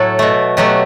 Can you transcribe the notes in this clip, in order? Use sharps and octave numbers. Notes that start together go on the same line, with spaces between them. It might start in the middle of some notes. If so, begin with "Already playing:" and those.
Already playing: A2 F#3 A4
B2 A3
B2 F#3 A3 G4